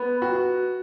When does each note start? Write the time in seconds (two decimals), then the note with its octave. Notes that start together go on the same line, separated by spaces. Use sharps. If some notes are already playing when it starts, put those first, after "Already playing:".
Already playing: B3
0.22 F#4